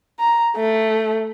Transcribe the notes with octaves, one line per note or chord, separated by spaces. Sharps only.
A#5
A3